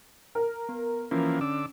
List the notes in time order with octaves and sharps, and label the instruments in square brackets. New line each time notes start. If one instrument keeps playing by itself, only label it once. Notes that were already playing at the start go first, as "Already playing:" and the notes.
[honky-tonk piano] A#4
[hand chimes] B3
[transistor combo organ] E3 F3 A#3 [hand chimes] C#4
[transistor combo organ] D3 D6 E6